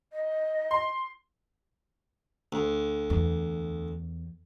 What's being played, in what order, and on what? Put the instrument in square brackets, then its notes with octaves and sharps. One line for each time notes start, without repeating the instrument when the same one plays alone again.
[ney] D#5
[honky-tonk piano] C6
[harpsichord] D2
[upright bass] E2